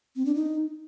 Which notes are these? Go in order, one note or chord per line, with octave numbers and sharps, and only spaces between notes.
C4
D4
D#4